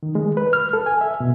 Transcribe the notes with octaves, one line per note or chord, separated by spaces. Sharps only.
D#3
G#3
B4
F6
A4
G#5
E5
B2